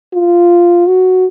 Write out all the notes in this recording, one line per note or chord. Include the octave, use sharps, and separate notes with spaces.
F4
F#4